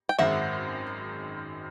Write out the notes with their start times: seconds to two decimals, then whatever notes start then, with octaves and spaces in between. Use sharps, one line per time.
0.09 G5
0.18 G#1 F#2 D#3 G#3 C4 E5 F#5